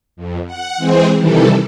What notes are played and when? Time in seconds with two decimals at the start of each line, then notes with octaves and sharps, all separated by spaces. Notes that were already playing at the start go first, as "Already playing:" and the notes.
0.16 F2
0.46 F#5
0.77 E3 G#3 C4 G#4 C5
1.15 C3 D#3 E3 G3 A4